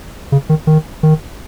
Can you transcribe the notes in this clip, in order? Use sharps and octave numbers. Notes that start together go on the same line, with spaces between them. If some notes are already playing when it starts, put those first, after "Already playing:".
C#3
D#3
D#3
D#3